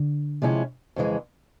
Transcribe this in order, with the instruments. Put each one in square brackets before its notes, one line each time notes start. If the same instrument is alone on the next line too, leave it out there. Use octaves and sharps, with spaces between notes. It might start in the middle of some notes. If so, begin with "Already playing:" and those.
Already playing: [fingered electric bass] D3
[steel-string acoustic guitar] C3 F3 G#3 C#4 E4
F2 C#3 E3 G#3